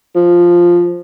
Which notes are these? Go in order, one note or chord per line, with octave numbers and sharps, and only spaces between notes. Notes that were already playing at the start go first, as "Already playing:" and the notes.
F3